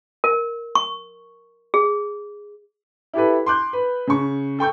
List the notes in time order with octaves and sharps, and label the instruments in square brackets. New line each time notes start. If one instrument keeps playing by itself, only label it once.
[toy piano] A#4
C#6
G#4
[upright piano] E4 G4 A4 B4
C6 D6 F#6 G6
B4
C#3 C#6
A4 G5 C#6 G6